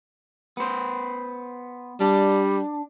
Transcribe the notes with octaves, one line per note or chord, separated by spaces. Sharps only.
B3 C5
G3 D4